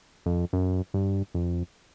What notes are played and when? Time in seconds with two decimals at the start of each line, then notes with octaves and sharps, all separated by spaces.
0.26 F2
0.53 F#2
0.94 G2
1.34 F2